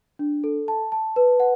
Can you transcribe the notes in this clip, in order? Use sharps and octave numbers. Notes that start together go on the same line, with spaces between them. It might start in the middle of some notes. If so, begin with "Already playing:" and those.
D4
A4
A5
A5
B4
F#5